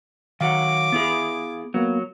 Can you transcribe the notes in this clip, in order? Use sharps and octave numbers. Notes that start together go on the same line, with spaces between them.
D#3 F#3 F5 F#5 D6
B3 E4 G#4
F#3 A#3 B3